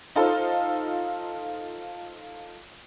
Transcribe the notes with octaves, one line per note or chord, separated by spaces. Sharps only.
D#4 F4 A4 C5